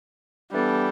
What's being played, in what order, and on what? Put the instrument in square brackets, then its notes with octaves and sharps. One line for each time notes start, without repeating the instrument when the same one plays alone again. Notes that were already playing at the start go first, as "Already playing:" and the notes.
[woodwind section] E3 B3 D4 A4 [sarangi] G3